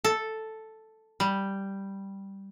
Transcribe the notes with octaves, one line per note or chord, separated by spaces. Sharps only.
A4
G3